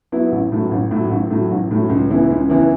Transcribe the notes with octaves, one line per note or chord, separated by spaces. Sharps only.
F#3 B3 E4
A1
A2 F#3
A1
A2 F#3
A1
A2 F#3
A1
A2 F#3
C#2
C#3 E3 B3 E4
C#2
C#3 E3 B3 E4